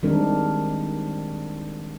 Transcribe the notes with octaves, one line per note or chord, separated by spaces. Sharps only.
D#3 G3 G#3 C4 D4 A#4